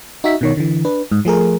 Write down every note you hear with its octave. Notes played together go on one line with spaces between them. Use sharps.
D#4 F#4 E5 B6
B2 D#3 C#5
D3 E3
D4 B4
G#2
F3 A3 G#4 A#4